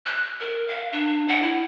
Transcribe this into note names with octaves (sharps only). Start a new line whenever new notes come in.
F#6
A#4
F5
D4
F#5
E4